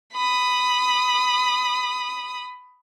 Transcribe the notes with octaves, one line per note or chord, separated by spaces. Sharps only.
B5 D#6